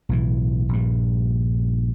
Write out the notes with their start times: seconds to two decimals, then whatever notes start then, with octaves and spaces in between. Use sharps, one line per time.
0.09 B1 A2 E3
0.69 A#1 G2